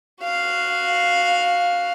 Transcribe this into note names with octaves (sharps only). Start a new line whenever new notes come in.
F#4 F5